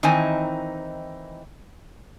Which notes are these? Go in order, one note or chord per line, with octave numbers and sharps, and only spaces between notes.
D#3 E3 C4 D#4 G#5